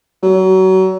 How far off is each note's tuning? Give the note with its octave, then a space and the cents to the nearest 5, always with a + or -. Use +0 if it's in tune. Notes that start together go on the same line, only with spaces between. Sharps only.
F#3 +30